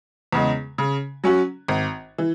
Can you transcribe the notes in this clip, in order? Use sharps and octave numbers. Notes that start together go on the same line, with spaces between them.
E2 C#3 G#3
C#3
F#3 C#4 F#4
G#1
E3